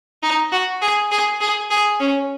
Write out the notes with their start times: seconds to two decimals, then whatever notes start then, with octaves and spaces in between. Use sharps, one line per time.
0.23 D#4
0.52 F#4
0.82 G#4
1.11 G#4
1.41 G#4
1.70 G#4
2.00 C#4